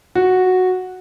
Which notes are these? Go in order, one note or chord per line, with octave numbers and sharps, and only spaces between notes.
F#4